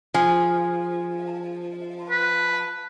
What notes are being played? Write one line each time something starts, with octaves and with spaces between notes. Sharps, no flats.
F3 G#4
B4